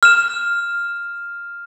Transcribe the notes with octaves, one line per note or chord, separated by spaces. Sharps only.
F6 E7